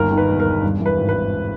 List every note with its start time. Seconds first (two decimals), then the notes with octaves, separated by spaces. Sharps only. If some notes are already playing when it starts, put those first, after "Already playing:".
Already playing: G1 D#2 A#4
0.11 D#3
0.17 B4
0.29 E1
0.40 A#4
0.46 E1
0.62 G2
0.80 E3
0.86 B4
0.97 G#1
1.09 B4
1.15 G#1